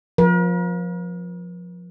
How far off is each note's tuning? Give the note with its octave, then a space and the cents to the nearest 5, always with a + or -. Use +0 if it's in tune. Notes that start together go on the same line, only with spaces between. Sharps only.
F3 +20 A#4 +45